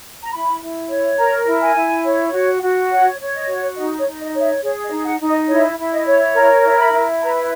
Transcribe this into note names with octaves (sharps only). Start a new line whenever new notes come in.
A#5
E4 B5
E4
C#5
A#4 A#5
E4
G#5
E4
C#5
F#4
F#4
C#5 F#5
C#5
D#5
F#4
D#4 D#5
C#5
D#4
D#5
C#5
E5
G#4 C#5
D#5
D#4
F#5
D#4
D#5
E4 C#5
E4
D#5
C#5
A#4 A#5
E4
B5
E4
B4 A#5